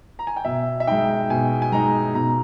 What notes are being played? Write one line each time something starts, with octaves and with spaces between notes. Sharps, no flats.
A#5
G#5
G5
B2 E5
E5
G#3 D#4 G5
B2 G#5
G#5
G#3 D#4 A#5
B2 A#5